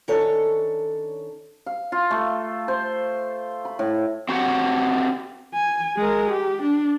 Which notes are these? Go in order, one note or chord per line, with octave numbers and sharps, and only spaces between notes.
D#3 C#4 D4 A4 C#5
F5
F4
A3
C5
B5
A2
C4 F#4 G4 C#5 F#5
G#5
G#3 A#4
G4
D4